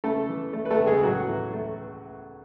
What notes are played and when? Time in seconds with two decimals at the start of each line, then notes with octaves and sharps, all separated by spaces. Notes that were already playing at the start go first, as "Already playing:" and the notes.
0.04 C#3 A3 A4
0.29 E3
0.53 A3
0.65 B4
0.70 A3 A4
0.78 C#2
0.86 G#3 G#4
1.03 A2 F#3 F#4
1.29 E3
1.53 A3